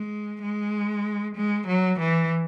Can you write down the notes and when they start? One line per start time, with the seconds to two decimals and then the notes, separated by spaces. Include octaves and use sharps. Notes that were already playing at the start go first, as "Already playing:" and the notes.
Already playing: G#3
0.42 G#3
1.36 G#3
1.67 F#3
2.00 E3